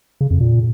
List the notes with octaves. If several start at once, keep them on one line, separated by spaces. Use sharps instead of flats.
C#3
F2
A#2